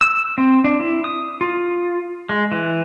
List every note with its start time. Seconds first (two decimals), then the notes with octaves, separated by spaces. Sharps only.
0.01 E6
0.38 C4
0.64 D4
0.80 E4
1.04 D#6
1.41 F4
2.29 G#3
2.52 E3